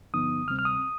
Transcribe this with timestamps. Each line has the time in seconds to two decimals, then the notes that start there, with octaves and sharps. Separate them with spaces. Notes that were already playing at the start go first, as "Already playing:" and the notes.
0.14 G2 D3 F3 B3 D#4 D#6
0.47 D2 C3 G3 C4 F6
0.59 F6
0.65 D#6